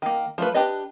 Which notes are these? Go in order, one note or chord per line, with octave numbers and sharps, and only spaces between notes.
D#3 A#3
F3 A3 B4
D4 G4 B4 D#5